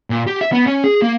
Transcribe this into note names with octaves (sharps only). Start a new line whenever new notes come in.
A#2
G4
E5
B3
C#4
G#4
A#3